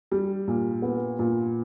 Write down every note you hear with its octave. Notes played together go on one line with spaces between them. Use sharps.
G3
A#2
B3
A#2